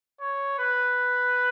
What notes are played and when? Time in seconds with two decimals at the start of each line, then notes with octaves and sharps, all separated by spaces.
0.21 C#5
0.59 B4